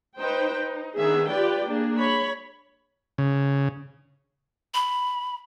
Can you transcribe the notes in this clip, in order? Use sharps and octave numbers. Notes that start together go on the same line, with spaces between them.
D#4 B4 C5 G5
D#4
D#3 B3 D4 G#4 E5
F4 G4 B4 D5 G5
A#3 D4 G#4
C#5 B5
C#3
B5